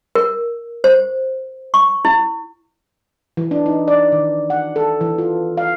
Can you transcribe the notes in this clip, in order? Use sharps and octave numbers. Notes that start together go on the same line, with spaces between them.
A#4
C5
C#6
E4
E3
D4
D#4
D5
D#3
F#5
A4
E3
F4
F5